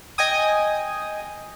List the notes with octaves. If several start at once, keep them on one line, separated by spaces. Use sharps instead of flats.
D#5 G5 G#5 D#6